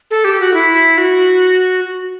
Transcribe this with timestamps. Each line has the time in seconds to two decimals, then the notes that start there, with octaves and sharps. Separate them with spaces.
0.11 A4
0.25 G4
0.40 F#4
0.54 E4
0.98 F#4